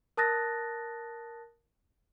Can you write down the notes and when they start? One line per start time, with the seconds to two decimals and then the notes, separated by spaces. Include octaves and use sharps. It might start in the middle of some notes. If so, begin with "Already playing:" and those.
0.17 A#4 A5 D#6 F#6 A6 A#6